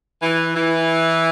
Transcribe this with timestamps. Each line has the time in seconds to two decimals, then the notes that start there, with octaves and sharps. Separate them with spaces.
0.22 E3
0.55 E3